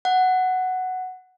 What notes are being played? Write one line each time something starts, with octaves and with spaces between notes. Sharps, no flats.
F#5